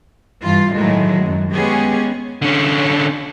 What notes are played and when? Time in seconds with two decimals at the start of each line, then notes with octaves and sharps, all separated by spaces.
0.42 G2 E3 F4
0.74 A2 D#3 F#3 G#3
1.23 F#2
1.52 G#3 B3 C#4 G4 G#4
2.42 D3 C#4